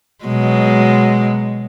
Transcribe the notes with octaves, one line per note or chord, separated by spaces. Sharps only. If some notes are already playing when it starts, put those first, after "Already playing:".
B2 F#3 G#3